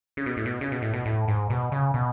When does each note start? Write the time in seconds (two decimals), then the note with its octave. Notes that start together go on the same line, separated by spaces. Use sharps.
0.17 C#3
0.26 B2
0.37 A2
0.46 B2
0.61 C#3
0.72 B2
0.82 A2
0.93 B2
1.06 A2
1.28 G#2
1.50 B2
1.72 C#3
1.94 B2